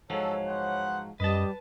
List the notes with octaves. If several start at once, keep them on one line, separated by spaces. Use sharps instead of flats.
G#2 F3 F#3 A4 C#5
B3 C5 F#5
F#2 G3 B4 D#5 A5